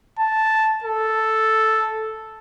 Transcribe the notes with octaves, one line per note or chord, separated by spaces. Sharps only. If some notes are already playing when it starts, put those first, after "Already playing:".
A5
A4